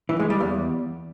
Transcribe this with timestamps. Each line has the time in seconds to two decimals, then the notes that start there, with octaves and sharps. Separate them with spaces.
0.09 E3
0.20 G#3
0.30 G3
0.40 E2